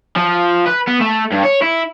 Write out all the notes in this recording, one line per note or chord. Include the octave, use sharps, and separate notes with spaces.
F3
B4
B3
A3
G2
C#5
E4